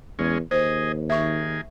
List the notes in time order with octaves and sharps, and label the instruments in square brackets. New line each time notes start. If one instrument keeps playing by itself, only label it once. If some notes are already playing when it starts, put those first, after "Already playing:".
[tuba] E2 [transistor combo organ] G#3 C#4
[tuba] D#2 [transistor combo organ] G#4 D#5 [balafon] C5
[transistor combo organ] D#3 G#4 [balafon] E5 C#6